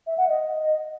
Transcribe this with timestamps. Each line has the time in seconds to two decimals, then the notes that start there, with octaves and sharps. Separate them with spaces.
0.07 E5
0.18 F#5
0.29 D#5